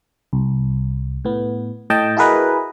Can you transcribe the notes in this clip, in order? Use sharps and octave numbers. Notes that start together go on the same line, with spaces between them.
C2
A2 B3
A2 D#5 G5 A5
E4 F#4 G#4 A#4 B4 D#5